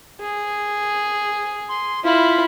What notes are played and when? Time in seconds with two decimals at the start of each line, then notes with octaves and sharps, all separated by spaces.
0.21 G#4
1.69 C6
2.04 E4 F4 B5